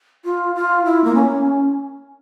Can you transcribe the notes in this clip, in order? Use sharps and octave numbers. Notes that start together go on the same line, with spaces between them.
F4
F4
E4
A#3
C#4